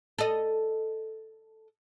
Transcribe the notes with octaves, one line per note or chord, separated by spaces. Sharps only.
A4 D#5